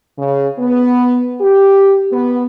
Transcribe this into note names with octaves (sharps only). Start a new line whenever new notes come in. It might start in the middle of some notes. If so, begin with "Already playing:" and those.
C#3
B3
G4
B3